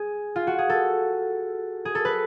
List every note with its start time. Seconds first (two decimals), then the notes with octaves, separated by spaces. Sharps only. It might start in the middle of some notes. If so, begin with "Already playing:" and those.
Already playing: G#4
0.36 F4
0.47 F#4
0.58 G#4
0.70 A4
1.85 G#4
1.95 A4
2.05 B4